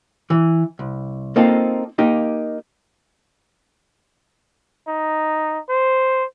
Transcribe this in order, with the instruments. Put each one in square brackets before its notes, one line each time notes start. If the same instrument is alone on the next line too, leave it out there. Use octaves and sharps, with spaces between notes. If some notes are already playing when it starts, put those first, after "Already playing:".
[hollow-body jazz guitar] E3
C2
A#3 C4 D#4 F4 A4
A#3 D#4 G4
[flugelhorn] D#4
C5